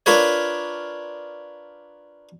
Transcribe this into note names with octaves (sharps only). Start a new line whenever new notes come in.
D4 F4 A#4 B4 C#5